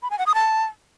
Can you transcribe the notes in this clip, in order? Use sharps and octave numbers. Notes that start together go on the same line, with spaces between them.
B5
G#5
F#5
D#6
A5